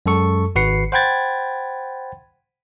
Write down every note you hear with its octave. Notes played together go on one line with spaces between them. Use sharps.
F#2 G#3 A4 C#6
G#1 F#4 B4 C7 C#7
C5 F#5 G5 B5 G#6 A6